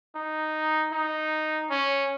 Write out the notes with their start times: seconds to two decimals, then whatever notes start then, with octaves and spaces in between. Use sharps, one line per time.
0.15 D#4
0.92 D#4
1.70 C#4